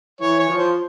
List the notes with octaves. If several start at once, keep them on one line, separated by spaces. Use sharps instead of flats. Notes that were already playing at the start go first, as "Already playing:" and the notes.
E3 C#5
C#5
F3
C5